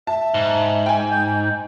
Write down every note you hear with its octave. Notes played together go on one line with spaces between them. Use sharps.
E5 A5
G#2
G5 G#5
G6